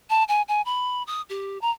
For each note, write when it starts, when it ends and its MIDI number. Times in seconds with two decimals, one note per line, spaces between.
0.10 0.23 81
0.29 0.42 80
0.48 0.62 80
0.65 1.03 83
1.07 1.22 87
1.30 1.58 67
1.62 1.70 82